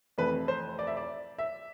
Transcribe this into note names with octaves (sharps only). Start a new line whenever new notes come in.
F1 F2 E3 A3 B4
C5
D5
E5
D5
E5